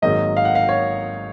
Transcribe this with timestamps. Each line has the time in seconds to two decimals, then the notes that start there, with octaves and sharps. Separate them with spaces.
0.02 G#1 G#2 D#3 F#3 A#3 D#5
0.37 F5
0.45 F#5
0.55 F5
0.69 C#5